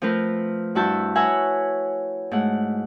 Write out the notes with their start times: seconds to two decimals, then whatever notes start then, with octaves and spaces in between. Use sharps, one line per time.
0.02 F3 A3 C4 F4 A#4 B4
0.75 G2 E4 F#4 E5 A5 G6
1.15 B4 C#5 E5 F#5 G#5 A#5
2.31 G#2 A3 F#5